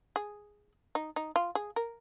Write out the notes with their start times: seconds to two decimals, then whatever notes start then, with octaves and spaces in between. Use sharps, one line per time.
0.16 G#4
0.95 D#4
1.16 D#4
1.36 F4
1.55 G#4
1.76 A#4